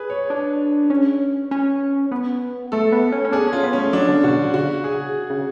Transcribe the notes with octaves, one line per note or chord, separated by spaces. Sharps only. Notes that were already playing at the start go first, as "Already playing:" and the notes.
Already playing: G#4 B4
C#5
D4
C#4
C#4
B3
A3 A4
B3
C#4
C#4
D4 G#4
C#4
F4
B3
C#4
A3
F#3 D4
D3
B2 F#4
D3
C#3 F#4
G#4
C#3